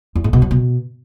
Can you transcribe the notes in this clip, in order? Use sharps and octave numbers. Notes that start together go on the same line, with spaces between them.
E2
G#2
B2
F#3
B2